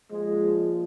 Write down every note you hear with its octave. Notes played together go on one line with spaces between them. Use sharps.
A#2 F3 G#3